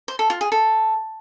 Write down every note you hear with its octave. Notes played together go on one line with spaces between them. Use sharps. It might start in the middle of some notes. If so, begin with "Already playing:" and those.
C5
A4
F4
G#4
A4